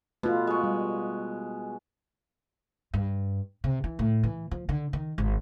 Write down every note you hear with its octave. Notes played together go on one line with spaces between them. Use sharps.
B2 A3 F4
G#3 C#6
G3
G2
C3
E3
A2
E3
F3
D3
D#3
G#1